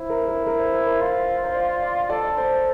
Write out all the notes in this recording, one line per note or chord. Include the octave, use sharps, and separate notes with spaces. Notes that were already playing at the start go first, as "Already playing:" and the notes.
Already playing: E4 C5
A#4
A#4
A#4
C5
A#4
A#4
F4 C5
C5
D5
D5
A4 D5
C5